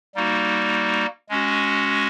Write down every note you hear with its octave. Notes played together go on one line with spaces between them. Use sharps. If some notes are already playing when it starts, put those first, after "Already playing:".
G3 A#3 D#4 F#4
G#3 C#4 F#4